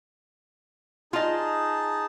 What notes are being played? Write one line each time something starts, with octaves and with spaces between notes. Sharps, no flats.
D#4 F4 G#4 D#5 A5